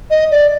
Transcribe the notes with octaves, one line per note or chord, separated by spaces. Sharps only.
D#5
D5